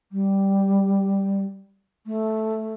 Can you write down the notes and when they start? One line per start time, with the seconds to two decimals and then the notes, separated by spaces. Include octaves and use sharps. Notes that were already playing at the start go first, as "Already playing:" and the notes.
0.11 G3
2.06 A3